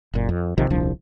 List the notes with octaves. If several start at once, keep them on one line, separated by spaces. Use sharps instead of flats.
F#1 A#2
F2
A#1 C3 D#3 F3
D#1 C2 F3 D4